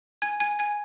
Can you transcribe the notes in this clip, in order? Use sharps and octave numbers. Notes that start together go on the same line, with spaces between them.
G#5 G#6
G#5 G#6
G#5 G#6